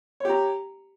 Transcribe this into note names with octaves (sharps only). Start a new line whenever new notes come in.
G4 C#5 A#5